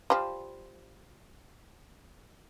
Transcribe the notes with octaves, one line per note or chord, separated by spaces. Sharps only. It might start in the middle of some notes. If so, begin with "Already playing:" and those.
F3 G3